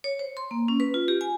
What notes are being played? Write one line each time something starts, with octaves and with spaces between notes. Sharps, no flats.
C#5
C5
C6
A#3
C#4
B4
F4
G4
G#5